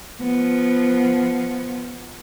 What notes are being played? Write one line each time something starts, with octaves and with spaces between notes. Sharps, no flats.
F3 B3